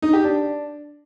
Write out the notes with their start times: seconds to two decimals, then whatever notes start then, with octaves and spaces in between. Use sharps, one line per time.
0.02 D#4
0.13 G4
0.24 D4